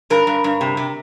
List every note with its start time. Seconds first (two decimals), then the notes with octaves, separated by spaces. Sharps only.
0.10 G2 A#4
0.27 G2
0.44 G2
0.61 C3
0.77 C3